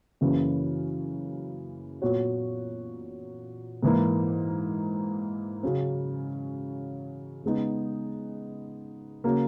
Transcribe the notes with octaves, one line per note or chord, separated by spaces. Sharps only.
F#2 C#3 E3 A#3 C#4
A#2 F#3 B3 F#4 C#5
G#2 E3 A#3
C#3 F#3 C#4
C#3 G#3 B3 D#4
C#3 F#3 A#3